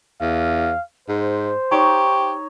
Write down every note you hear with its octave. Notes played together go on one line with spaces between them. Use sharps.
E2 F5
G#2 C5
D#4 G4 C#5 C#6